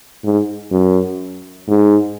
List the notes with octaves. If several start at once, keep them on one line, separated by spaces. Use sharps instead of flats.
G#2
F#2
G#2